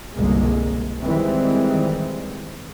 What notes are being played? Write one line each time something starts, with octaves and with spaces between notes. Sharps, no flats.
G1 C2 B2 G#3 A#3
D#3 E3 G3 G#3 C4